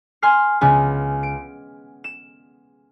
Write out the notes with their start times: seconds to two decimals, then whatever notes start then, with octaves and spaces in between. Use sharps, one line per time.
0.22 G#5 C6 F6 C7
0.61 C#2 C#3 B3 G#5
1.23 D7
2.04 E7